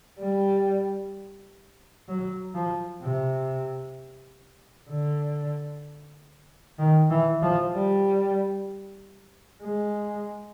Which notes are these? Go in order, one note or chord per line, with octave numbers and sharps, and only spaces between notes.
G3
F#3
F3
C3
D3
D#3
E3
F3
G3
G#3